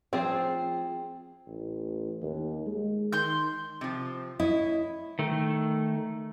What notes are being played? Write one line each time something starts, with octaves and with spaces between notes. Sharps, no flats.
F3 C4 F4 G#4
A1
D#2
G#3
D#3 C6 G6
C3 F3
E4 C#5 D#5
D#3 A3